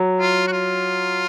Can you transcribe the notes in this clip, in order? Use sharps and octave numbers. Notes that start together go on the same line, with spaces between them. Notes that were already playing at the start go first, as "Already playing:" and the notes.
Already playing: F#3
F4
F#4
F4